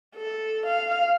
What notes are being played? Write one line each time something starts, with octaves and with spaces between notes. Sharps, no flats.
A4
F5